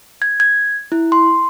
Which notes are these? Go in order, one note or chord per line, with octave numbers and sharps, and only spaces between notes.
G#6
G#6
E4
C6